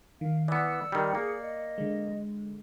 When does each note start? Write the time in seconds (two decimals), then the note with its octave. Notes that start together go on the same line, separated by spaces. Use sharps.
0.21 D#3 F5
0.48 E3 B3 D5 E6 C#7
0.92 D#3 G3
1.15 A#3 G#4
1.41 D#5
1.78 D3 G#3